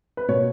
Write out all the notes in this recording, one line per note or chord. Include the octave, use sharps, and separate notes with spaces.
B4
B2 A#3 C#5